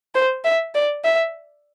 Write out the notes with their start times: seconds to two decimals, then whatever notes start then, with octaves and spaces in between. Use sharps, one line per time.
0.15 C5
0.45 E5
0.75 D5
1.05 E5